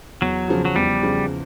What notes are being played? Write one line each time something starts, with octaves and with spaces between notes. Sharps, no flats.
E2 F#3
C#3 F3
F#3
E2 G3
C#3 F3